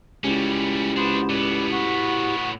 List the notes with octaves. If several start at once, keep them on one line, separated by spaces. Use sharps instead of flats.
C#2 G3 C#4 E4 G4
B3 D4 F#4 C5
A2 B3 B4 D5
F#4